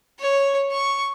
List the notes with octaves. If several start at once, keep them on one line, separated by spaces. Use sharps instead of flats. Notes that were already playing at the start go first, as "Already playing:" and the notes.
C#5
C#6